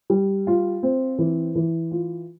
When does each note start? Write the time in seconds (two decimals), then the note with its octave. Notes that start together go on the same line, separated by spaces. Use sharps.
0.10 G3
0.47 F4
0.83 C4
1.19 E3
1.55 E3
1.91 F4